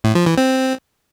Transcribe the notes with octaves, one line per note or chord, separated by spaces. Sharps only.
A2
F3
E3
C4